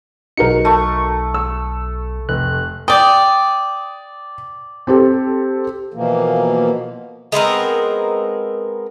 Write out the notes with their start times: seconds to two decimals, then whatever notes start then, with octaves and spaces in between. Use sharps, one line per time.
0.37 B1 D#4 F#4 A#4 C#7
0.65 A3 C#6
1.34 E6
2.29 F1 F#6
2.88 D5 G5 D#6
4.87 C4 G4 A4
5.94 B2 E3 F3 A#3
7.32 G#3 B3 C4 A#4